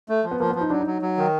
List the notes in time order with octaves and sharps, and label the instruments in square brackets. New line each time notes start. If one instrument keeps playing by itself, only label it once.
[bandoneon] A3
F3
[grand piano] B3
[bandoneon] F3 [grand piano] A#3
[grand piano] B3
[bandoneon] F3
[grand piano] D#4
[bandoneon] F#3 [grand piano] D4
[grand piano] D#4
[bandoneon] F#3
F#3
D#3